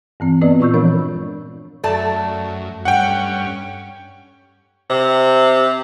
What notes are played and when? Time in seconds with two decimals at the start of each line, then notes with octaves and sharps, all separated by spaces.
0.20 G2 E3 C4
0.41 B3 C4 F#4 B4 D5 D#5
0.60 A#2 F4 C#6 E6 G6
0.74 E3 F3 G#3 D4 A#4 C#5
1.84 F#2 A3 D5 A5
2.85 G2 C#4 F#5 G5
4.90 C3